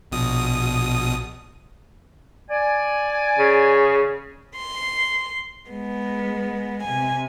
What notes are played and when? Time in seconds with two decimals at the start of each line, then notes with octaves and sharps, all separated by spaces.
0.12 A#1 B2 D#6
2.50 D5 G#5
3.38 C#3
4.58 C6
5.69 G#3 B3
6.84 C3 G#5